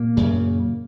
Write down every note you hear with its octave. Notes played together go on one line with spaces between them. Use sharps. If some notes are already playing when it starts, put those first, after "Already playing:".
Already playing: A#2 A#3
F#2 C#3